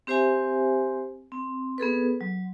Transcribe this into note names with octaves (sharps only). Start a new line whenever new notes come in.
C4 G4 C5 E5 G#5
C4
B3 G#4 A4 B4
F#3